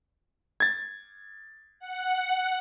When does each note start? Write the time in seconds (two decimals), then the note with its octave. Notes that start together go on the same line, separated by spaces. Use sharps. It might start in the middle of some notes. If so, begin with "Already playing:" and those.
0.60 G#6 A6
1.79 F#5